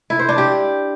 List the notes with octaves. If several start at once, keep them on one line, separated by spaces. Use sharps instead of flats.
E4
C5
D4
G4